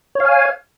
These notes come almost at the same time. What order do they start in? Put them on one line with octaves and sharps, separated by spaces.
C#5 F5 G#5